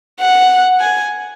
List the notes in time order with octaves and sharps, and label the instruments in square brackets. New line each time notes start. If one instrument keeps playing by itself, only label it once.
[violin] F#5
G#5